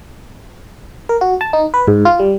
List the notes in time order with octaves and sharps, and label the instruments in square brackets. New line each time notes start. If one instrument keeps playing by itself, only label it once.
[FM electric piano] A#4
F#4
A5
D#4
B4
G#2
F4
G3